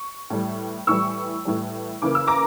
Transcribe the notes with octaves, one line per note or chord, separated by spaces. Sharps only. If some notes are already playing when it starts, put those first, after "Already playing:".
Already playing: C#6
A2 E3 G3
A2 E3 G3 C#6 E6
A2 E3 G3
C#3 E3 A#3 D6
E6
A#5 D6